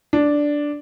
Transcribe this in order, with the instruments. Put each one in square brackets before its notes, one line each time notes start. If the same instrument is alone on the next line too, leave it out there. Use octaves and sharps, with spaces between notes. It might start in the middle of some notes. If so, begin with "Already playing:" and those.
[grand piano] D4